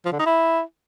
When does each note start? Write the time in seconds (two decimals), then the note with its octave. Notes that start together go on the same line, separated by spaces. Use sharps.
0.06 F3
0.13 D3
0.19 D#4
0.26 E4